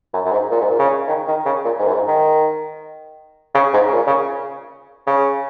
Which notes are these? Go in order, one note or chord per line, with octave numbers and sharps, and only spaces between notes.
F#2
F#2
G#2
A#2
G#2
A#2
C#3
D#3
D#3
C#3
A#2
G#2
F#2
G#2
D#3
C#3
G#2
C#3
A#2
C#3
C#3